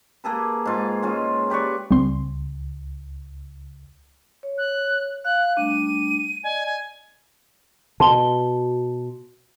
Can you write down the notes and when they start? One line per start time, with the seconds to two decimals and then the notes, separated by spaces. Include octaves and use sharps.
0.24 A#3 G#4 A4 B4
0.65 G#2 F4
1.03 G#3 C#4 F4
1.50 G4 B4 D5 C#6
1.91 C#2 G3 C4 C6
4.43 C#5
4.58 F#6
5.25 F5 F#6
5.57 G3 A3 D4 D#7
6.44 D5 D#5 G#5
6.66 G#5
8.00 B2 A5 C6 G7